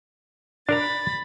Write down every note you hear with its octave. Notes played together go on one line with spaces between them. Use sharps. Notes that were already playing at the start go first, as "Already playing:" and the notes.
D4 A#4 A#5 B5 A6